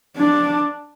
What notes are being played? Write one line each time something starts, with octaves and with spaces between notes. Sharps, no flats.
D4